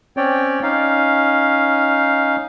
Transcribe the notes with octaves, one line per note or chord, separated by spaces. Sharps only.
C4 C#4 C#5 D5 G5
C#4 D#4 F5